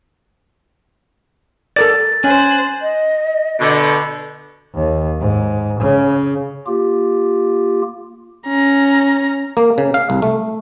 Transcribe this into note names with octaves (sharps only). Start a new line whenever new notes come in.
A4 A#4 D5 A6
C#4 C5 G#5 F#6
D#5
B2 D3
D#2
G#2
C#3
A#3 F4 G4
C#4 A#5
A#3
C#3
F5
C2
A3